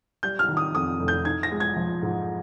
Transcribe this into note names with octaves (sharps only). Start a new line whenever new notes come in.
G3 G6
F6
D#3
D#6
F2 D#6
F1
G6
D#4 G#6
A#6
G#3
G#6
F3
G#2